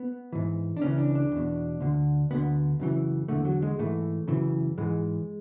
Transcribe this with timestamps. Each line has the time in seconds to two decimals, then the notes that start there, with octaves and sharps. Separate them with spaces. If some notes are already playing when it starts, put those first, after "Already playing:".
Already playing: B3
0.33 G#2 E3
0.77 D4
0.82 C#2 C#3 E3 C#4
0.98 D4
1.15 D4
1.32 E2 B2
1.80 D2 D3
2.31 D2 D3 B3
2.80 F#2 C#3 E3
3.28 E2 D3 A3
3.45 F#3
3.62 G#3
3.79 G#2 E3 A3
4.28 F#2 C#3 E3
4.78 G#2 E3 G#3